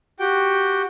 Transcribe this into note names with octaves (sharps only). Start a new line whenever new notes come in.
F#4 G4 G5